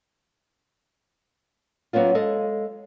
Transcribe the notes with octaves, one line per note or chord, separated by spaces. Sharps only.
F#3 A#3 B3 C#4 F4
G#3 A4 D#5 F5